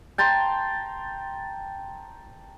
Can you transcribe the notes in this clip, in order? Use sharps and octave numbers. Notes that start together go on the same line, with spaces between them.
G5 A5 A#5 C6